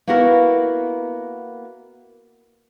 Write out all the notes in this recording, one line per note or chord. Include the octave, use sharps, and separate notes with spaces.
A#3 B3 E4 F#4 A#4